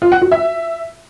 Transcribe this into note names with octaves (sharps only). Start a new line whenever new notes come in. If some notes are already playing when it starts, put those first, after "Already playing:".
F4
F#5
F#4
E5